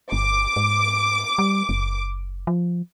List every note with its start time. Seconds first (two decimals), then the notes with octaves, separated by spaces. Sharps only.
0.12 G1 D6
0.56 G#2
1.39 G3
1.69 F#1
2.47 F3